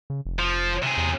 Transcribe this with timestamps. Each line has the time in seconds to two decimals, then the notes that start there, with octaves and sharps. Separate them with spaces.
0.10 C#3
0.25 F1
0.39 F3
0.83 C3 G#4
0.97 E2